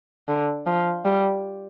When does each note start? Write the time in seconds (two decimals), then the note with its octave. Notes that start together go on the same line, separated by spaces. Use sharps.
0.28 D3
0.66 F3
1.05 G3